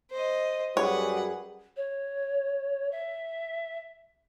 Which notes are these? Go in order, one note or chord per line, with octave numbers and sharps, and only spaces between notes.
C5 D#5
F#2 G3 F#4 G#4 B4 C#5 F#5
C#5
E5